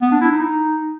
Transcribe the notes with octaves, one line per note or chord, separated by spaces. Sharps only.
B3
D4
E4
D#4